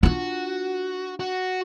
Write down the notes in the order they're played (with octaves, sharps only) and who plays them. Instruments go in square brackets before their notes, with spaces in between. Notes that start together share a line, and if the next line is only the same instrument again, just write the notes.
[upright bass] D4 F4 [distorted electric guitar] F#4
[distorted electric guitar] F#4